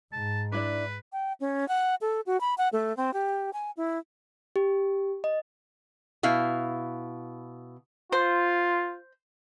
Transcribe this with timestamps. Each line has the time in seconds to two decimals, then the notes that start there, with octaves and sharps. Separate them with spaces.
0.13 G#2 A5
0.52 D4 E4 B4 D5
1.13 G5
1.40 C#4
1.68 F#5
2.01 A4
2.26 F#4
2.41 B5
2.58 F#5
2.73 A3
2.97 C4
3.14 G4
3.53 G#5
3.77 E4
4.56 G4
5.24 D#5
6.23 B2 E4 F5
8.12 F4 C5